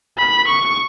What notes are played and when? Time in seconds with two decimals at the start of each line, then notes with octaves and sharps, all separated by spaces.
0.18 B5
0.47 C#6